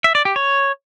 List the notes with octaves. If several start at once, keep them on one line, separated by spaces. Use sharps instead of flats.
E5
D5
G4
C#5